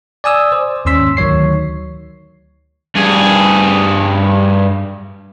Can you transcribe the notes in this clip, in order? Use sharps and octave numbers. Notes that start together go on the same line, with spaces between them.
D5 G#5 D#6 E6
C5 D5
D#2 G#2 C#4 C6 E6 B6
D2 D#3 F#3 C#5 C7
G2 G#4